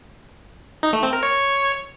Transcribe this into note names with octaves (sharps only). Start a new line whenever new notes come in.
D#4
A3
C4
A#4
C#5